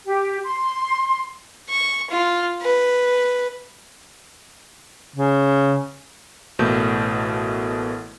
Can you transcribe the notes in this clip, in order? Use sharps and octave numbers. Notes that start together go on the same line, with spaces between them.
G4
C6
C#6
F4
B4
C#3
A1 B2 A3 A#3 G6